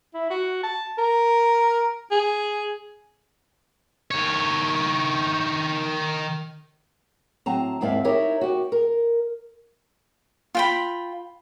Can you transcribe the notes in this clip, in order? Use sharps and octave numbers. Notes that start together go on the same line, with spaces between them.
E4
F#4
A5
A#4
G#4
D#3 C#5
A2 F#3 C4 A5 A#5
D#2 G#2 C4 E4 D5 F5
D#4 E4 G4 A#4 C#5 E5
F#4 G4
A#4
F4 G5 B5